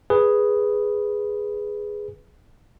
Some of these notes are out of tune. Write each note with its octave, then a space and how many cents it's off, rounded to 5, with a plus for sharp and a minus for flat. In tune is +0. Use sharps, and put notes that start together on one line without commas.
G#4 +0 B4 +0